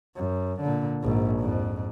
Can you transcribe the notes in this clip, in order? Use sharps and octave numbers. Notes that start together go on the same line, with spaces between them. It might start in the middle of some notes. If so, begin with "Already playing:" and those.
F#2
A#2 D3
A#1 G#2
F2 G#2